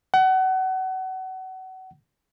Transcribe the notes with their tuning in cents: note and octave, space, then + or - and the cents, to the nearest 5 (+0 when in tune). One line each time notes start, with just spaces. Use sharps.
F#5 +30